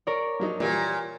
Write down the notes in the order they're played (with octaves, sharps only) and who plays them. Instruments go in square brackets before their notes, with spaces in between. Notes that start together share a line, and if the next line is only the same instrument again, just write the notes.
[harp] A#4 C#5 D5
[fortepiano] F3 F#3 D#4
[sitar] A#2 [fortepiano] E3 G3 A#3